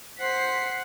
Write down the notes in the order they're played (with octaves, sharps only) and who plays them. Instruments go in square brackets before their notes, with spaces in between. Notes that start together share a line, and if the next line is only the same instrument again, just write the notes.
[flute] C5 [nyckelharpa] F#5 [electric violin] B6 C7